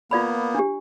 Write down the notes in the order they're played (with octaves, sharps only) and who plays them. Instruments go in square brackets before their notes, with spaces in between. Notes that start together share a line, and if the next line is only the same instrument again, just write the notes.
[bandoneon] A#3 B3 [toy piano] F4 D5 B5
[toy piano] D4 G4